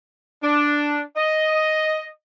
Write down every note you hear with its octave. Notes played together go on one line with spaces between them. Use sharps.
D4
D#5